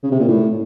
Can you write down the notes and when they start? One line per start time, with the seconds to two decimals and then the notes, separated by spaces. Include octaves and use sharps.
0.03 C#3
0.12 C3
0.20 A#2
0.28 A2